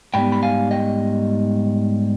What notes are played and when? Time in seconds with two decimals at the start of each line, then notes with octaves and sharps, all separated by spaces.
0.14 G#2 G3 B3 G5 B5
0.32 B5
0.43 F5 G#5
0.71 D#5 G5